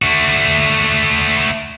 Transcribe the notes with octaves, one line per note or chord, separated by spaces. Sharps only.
A3 F#4